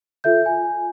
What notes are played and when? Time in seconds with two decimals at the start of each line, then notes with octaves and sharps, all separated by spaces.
0.24 F4 A4 E5 G6
0.46 G#5